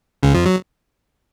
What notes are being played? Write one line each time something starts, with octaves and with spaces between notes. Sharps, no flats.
C#2 C#3
F2 F3
F#3